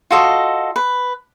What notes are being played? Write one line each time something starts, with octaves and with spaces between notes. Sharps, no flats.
F4 F#4 A4 D#5
B4